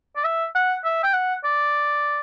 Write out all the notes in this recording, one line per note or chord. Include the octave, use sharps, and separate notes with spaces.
D5
E5
F#5
E5
G5
F#5
D5